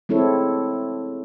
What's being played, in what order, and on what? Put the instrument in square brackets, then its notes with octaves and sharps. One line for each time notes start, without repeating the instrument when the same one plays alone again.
[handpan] G#3 C4 E4 A4 C#5